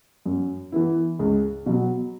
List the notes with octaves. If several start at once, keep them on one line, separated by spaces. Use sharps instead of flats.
F#2
E3 B3 E4
C#2
B2 F#3